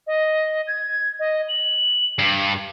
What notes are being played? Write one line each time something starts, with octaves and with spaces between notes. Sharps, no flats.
D#5
G#6
D#5
F#7
G2